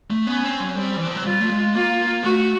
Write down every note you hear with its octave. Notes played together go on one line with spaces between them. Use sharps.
A3
B3 C#4
C4
F#3
G3 C4
E3
F3
F#3
G3 F4
A3
G#3
A#3 F4
A3 F#4